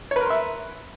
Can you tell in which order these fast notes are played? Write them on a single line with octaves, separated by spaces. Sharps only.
C#5 B4 A#4 C6 E5